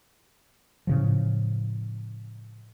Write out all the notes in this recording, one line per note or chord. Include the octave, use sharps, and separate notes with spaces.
A2 C#3 F3